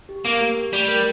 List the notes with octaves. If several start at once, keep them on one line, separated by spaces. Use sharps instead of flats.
G4
A#3 A#4
G4
G4
G3 A3
A#4